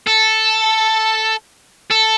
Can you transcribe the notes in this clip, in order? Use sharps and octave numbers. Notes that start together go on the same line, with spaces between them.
A4
A4